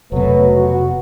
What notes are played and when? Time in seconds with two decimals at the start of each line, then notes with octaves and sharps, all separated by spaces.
0.12 F1 B2 F#3 A3 B4
0.56 F#4